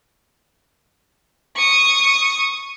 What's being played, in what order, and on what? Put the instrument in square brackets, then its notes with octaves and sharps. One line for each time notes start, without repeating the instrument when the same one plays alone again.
[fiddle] C#6 D#6